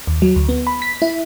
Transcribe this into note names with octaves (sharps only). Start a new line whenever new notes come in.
D#2
F#3
D2
B3
B5
B6
E4